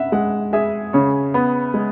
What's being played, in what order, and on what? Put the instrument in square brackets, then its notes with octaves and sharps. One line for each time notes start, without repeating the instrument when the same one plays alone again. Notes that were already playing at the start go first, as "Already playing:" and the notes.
Already playing: [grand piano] C#4 [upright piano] E5 F#5
[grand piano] G#3 [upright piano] F#5
[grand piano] G#4 [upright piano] E5
[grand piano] C#3 [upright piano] C#5
[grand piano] B3
G#3